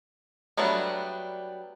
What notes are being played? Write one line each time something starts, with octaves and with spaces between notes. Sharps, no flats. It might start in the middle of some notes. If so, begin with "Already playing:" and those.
F#3 G3 A3 B3 D4